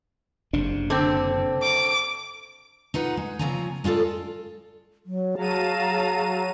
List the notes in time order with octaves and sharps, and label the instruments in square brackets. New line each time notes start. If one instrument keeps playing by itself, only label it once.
[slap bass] F#1 C3 D4
[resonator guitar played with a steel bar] D3 C4
[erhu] D6
[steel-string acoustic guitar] D#4 F4 B4 F#5
G#3
A#2 C#3 F3 C4 G#5 A#5
G#3 F4 F#4 A4 D5
[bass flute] F#3
[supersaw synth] F#3 D#7 [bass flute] G#4 [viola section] F5 A5 A#5